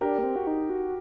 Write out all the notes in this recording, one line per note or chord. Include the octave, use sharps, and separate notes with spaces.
D4 G4 A#4
A#3
C4
F#4
D#4
F#4